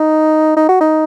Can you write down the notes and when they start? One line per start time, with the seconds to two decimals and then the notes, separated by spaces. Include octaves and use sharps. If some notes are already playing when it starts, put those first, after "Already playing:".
Already playing: D#4
0.57 D#4
0.69 F#4
0.81 D#4